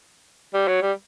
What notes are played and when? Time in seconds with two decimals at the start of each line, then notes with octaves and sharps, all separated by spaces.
0.54 G3
0.68 F#3
0.82 G3